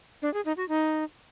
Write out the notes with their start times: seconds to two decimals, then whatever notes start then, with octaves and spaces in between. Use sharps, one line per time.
0.22 D4
0.34 G#4
0.45 D#4
0.57 F#4
0.68 D#4